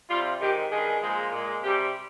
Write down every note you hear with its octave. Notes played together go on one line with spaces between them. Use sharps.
C3 G3 F4
G#2 D#3 G#3 G4
G2 D#3 G#3 G#4
A#2 F3 G#3
A#2 G#3
C3 G3 G4